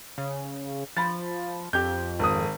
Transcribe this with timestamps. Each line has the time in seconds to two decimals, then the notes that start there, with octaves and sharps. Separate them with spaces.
0.18 C#3
0.97 F3 B5 A6
1.73 F2 G4 G6
2.19 G#1 D#6